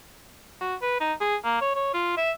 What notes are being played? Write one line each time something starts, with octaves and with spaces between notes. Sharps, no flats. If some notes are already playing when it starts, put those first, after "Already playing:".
F#4
B4
D#4
G#4
A#3
C#5
C#5
F4
E5